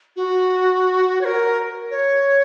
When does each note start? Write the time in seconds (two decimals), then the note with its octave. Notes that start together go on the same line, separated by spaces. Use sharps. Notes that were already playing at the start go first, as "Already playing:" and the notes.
0.16 F#4
1.21 C#5
1.25 A#4
1.91 C#5